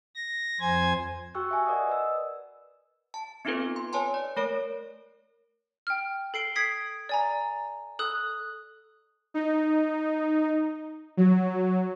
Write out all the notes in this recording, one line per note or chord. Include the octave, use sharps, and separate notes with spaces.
A#6
F2 C5 G#5 G#6
F#4 G4 G5 C#6 E6 F#6
E5 G#5
A#4 D5 D#5 F#5 D#6
B4 D#5 E6
A5
B3 C4 D#4 F4 A4 B4
C6
B4 C#5 G#5 A5 C6
D5
A3 A#4 C#5 D7
G5 F6
A4 C7 D7 G7
D#6 G#6 B6 C7 D7
D5 G#5 A#5
A4 D#6 F#6
D#4
F#3